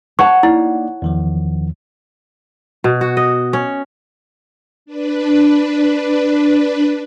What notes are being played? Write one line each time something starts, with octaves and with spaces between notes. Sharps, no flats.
C#5 F#5 A5 C#6
A#3 D#4 E4 D5
E2 D#3 F3
B2
F#4
D#5
C#4
D4 B4